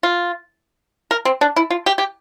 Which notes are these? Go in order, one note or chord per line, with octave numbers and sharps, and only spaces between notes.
F4
A#4
C4
D4
E4
F4
G4
G4